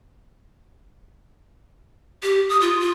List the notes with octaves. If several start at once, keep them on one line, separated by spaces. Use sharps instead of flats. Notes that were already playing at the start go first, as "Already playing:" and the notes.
G4
D#6
F4
F4